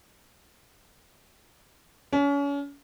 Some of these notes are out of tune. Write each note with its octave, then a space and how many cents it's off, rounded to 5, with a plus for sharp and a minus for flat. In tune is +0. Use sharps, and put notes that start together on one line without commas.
C#4 +35